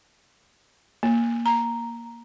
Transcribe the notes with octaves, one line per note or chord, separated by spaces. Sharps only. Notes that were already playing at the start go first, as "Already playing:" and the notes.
A#3
A#5